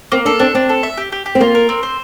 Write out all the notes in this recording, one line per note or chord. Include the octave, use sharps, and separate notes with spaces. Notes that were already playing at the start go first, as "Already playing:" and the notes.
A#3 C4
D4 A4
C4 D4
C4 D4
A4
E5
G4
G4
G4
C4
A#3 F4
A#4
C4
C5